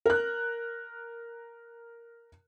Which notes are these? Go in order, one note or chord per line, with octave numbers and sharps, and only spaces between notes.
A#4 F#6